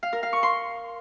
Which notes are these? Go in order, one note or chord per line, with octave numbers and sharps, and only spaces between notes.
F5
A#4
F5
C#6
C6